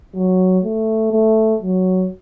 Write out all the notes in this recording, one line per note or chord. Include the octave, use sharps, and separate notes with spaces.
F#3
A3
A3
F#3